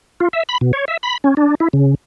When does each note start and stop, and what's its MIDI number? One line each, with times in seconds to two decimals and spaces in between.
0.20 0.28 65
0.33 0.43 76
0.49 0.58 83
0.61 0.72 47
0.73 0.85 73
0.88 0.97 76
1.03 1.17 83
1.24 1.34 61
1.37 1.55 62
1.60 1.68 64
1.73 1.95 49